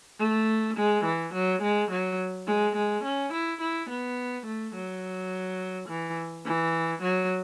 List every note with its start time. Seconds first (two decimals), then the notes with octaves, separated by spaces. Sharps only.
0.19 A3
0.77 G#3
1.05 E3
1.34 F#3
1.62 G#3
1.91 F#3
2.47 G#3
2.76 G#3
3.04 C#4
3.33 E4
3.61 E4
3.89 B3
4.46 A3
4.75 F#3
5.88 E3
6.45 E3
7.02 F#3